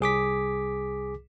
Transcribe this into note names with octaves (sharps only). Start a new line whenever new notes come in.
C2 G#4 D6 B6